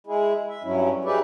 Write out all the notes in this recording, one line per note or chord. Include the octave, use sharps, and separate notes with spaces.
G#3 E4 G#4
E5
G2 F#3 C#4 E4
D#4 G4 G#4 B4 D5 E5